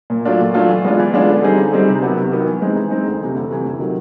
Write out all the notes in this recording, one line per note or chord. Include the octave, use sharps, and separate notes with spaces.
A#2
F#3 A3 D4 F4
A#2
F#3 A3 D4 F4
E3
G#3 B3 D4 F4
E3
G#3 B3 D4 F4
D3
G3 C4 D#4 G#4
D3
G3 C4 D#4 G#4
C3
D#3 F#3 B3
C3
D#3 F#3 B3
E3
G#3 C4 D#4
E3
G#3 C4 D#4
D2
C3 E3
D2
C3 E3
D2
C3 D#3 F#3